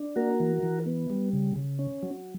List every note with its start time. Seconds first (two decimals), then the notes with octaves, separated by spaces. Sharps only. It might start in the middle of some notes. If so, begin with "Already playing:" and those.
Already playing: D4
0.16 A#3 F#4 A#4
0.40 E3
0.63 E3
0.86 B3
1.10 G3
1.33 C#3
1.56 C#3
1.79 C#4
2.03 F#3